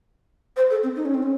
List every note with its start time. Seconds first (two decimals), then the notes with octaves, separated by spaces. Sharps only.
0.56 C5
0.70 A4
0.83 C4
0.96 D#4
1.05 C#4
1.14 C4
1.23 C#4